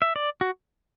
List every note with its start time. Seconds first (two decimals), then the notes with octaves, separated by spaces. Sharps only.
0.02 E5
0.16 D5
0.41 F#4